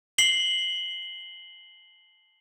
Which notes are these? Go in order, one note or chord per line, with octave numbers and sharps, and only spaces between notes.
C7 F#7 G7